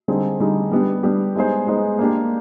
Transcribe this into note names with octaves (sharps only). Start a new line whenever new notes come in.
D3 G3 C4 D#4 G#4
D3 G3 C4 D#4 G#4
G3 B3 D4 G4
G3 B3 D4 G4
G#3 B3 D#4 G#4 C5
G#3 B3 D#4 G#4 C5
A#3 D4 G4